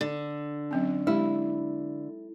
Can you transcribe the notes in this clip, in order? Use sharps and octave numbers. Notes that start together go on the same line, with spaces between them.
D3
F#3 C4 C#4
G#3 E4 G4